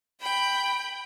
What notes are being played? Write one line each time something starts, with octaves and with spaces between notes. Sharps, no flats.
G5 B5